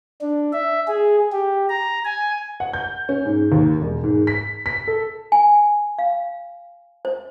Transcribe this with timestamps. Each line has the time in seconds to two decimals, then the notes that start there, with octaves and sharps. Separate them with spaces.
0.21 D4
0.52 E5
0.88 G#4
1.32 G4
1.69 A#5
2.05 G#5
2.60 F#5
2.73 G6
3.09 C#4
3.26 G#2
3.52 D#2
3.81 E1
4.04 G#2
4.27 B6
4.66 B6
4.87 A4
5.32 G#5
5.99 F5
7.05 C5